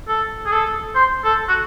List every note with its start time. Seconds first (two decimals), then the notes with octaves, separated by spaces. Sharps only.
0.08 A4
0.46 G#4
0.52 A4
0.95 C5
1.24 A4
1.48 F#4